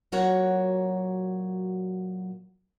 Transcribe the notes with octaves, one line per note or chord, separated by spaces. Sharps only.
A#2 F#3 F#4 A#4 C#5 F#5